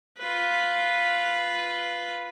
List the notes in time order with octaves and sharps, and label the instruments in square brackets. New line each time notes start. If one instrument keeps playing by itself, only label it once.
[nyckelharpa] F4 B4